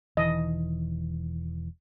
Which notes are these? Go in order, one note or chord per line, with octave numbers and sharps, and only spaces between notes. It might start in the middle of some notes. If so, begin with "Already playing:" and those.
E1 D#3 E3 D#5